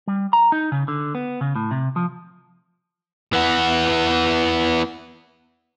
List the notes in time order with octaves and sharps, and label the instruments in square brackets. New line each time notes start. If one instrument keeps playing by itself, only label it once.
[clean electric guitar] G3
A#5
D#4
C#3
D3
B3
C#3
A2
C3
F3
[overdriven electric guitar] E3 B3